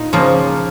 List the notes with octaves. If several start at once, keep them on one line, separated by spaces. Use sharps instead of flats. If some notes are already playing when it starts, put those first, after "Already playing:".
Already playing: A#2 D#4
C#3 F3 A#3